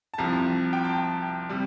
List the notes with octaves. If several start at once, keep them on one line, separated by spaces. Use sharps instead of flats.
A5
C2 C3 F3 A#5
G5
A5
C3 G3